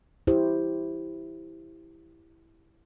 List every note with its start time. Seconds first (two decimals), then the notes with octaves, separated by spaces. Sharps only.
0.27 E4 G4 C5